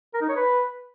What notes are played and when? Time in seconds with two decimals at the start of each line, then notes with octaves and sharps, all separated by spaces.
0.14 A#4
0.21 D#4
0.29 C#5
0.36 B4